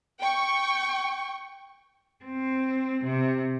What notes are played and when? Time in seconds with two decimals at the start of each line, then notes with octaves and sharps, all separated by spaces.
0.20 G5 C#6
2.25 C4
3.03 C3